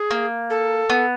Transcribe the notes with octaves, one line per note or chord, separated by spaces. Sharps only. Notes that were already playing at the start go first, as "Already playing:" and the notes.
Already playing: G#4
A#3
A4
B3